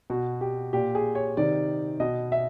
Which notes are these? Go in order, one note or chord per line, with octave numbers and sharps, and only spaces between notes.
B2 F#4
G4
A#2 G4
G#4
C#5
C3 D#3 D5
B2 D#5
E5